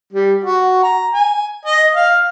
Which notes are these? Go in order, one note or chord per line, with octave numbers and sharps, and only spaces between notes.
G3
F#4
A#5
G#5
D#5
F5